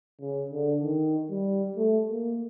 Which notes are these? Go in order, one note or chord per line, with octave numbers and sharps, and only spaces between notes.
C#3
D3
D#3
G3
A3
A#3